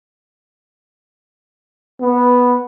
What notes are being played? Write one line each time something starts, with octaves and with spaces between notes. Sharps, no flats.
B3